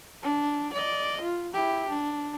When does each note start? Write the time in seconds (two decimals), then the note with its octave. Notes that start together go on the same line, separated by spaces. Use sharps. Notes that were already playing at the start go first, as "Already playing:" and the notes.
0.23 D4
0.73 D5 D#5
1.21 F4
1.53 E4 G4
1.89 D4